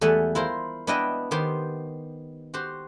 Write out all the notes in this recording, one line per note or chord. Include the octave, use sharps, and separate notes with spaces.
E2 G3 A3 E5 F#5 G#5
E4 F4 A#4 C5
B3 D4 E4 B4 D#5 G5
D#3 B3 G4 C5
F#4 G4 C5